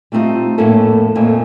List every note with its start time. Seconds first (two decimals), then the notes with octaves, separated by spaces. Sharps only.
0.12 G3 A3 C4 D#4 F4
0.58 F2 A2 A3 A#3 C#4 A4
1.15 F2 A#2 F3 A3 A#3 D#4